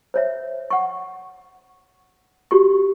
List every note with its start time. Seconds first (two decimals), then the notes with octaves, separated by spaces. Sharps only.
0.14 C5 C#5 E5
0.70 F#5 C#6
2.51 F#4 G4 C#6